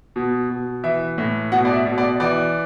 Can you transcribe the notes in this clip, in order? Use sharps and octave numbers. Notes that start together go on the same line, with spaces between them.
B2
B2
E3 E5
A2
B2 F#5
D5
E5
B2
D5
E3 D5